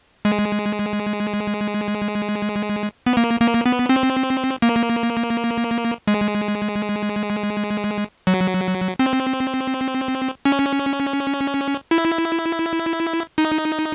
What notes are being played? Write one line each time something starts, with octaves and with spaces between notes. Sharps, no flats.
G#3
B3
A#3
A#3
B3
C4
A#3
G#3
F#3
C4
C#4
E4
D#4